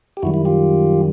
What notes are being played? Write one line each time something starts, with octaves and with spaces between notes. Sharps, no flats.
G4
F#2 D#3 G3 E4 F#4
E4
F4 G4